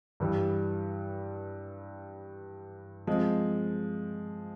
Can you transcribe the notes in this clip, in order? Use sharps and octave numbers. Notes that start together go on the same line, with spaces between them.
G2 E3 G3
F3 G#3 C4